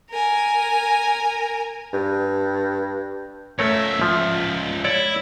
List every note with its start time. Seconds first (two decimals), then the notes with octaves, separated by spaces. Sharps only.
0.10 A#4 G#5
1.93 G2
3.59 C#2 A3 A#4 C#5 E5
4.02 F3
4.84 E4 C#5 D5